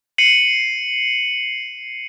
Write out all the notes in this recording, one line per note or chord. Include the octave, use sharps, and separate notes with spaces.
C7 C#7 D#7 F#7